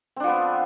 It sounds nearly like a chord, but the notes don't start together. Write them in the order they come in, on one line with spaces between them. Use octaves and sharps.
C4 D4 F3 B3